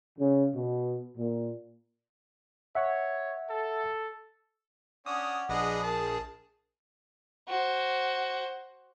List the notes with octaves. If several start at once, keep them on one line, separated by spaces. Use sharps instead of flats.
C#3
B2
A#2
C#5 E5 F#5
A4
C#4 D4 D5 F#5 D#6
A#1 B3 D4 G#4 D#5
A#4 A5
F#4 C5